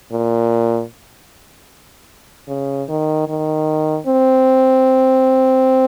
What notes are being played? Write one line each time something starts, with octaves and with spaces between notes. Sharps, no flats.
A#2
C#3
D#3
D#3
C4